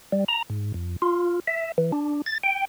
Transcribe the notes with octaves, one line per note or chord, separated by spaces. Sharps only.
G3
A#5
G#2
F2
F4
E5
E3
D4
A6
G5